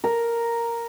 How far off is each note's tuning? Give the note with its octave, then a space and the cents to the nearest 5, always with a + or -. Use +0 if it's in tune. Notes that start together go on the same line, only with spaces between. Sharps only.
A#4 +0